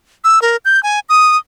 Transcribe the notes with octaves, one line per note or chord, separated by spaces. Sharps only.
E6
A#4
G6
G#5
D#6